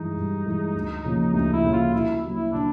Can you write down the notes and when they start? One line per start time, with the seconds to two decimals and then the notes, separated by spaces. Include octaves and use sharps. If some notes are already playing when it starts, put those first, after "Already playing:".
Already playing: G2 E3 G#3 D#4
0.16 G2
0.45 E3 G#3
0.74 D2
1.05 C#3 F3 A#3
1.33 D2 D#4
1.53 E4
1.64 C#3 F3 A#3
1.73 F4
1.93 C#3 E4
2.22 F#3 A#3
2.32 E4
2.52 C#3 D4